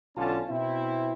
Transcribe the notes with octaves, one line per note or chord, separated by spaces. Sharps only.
B1 D3 C#4 F4 A5
B2 C4 E4